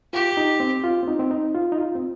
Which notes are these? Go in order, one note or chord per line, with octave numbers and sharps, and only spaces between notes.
F4 G4
D#4
C4
F4
C4
D#4
C4
D#4
F4
D#4
F4
C4